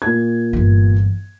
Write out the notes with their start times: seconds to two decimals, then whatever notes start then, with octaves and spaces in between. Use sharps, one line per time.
0.02 A#2 G#6
0.53 G1 E3